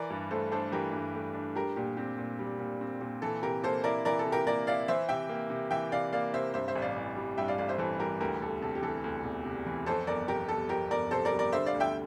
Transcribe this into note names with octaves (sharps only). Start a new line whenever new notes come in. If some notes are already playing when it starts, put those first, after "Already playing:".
Already playing: E3 A#4 D5
G2
A3 A4 C5
D4 A4 C5
E3 G4 A#4
G2
A3
D4
G3 G4 A#4
A#2 G4
C4 G4
A#2
G3
A#2
C4
A#2
E3 A4
C3 G4 A#4
A#3 A4 C5
E4 A#4 D5
E3 A#4 D5
A4
C3
G4 A#4
A#3 A#4 D5
E4 D5 F5
E3 C5 E5
C3 E5 G5
A#3
C3
E3 E5 G5
C3 D5 F5
A#3 D5 F5
C3 C5 E5
G2 C5 E5
C5 E5
A1
D5 F5
E3
G3
G2 E5 G5
D5 F5
A1 D5 F5
C5 E5
E3 A4 C5
G3 G4 A#4
D2 G4 A#4
E1 A4
C3 A4
G4
E3 A4
D2
E1
C3
E3
F2 A4 C5
G1 A#4 D5
C3 G4 A#4
G3 A4
F2 G4 A#4
G1 A#4 D5
C3 A4 C5
A#4 D5
G3
A#4 D5
D3 C5 E5
D5 F5
D2
E5 G5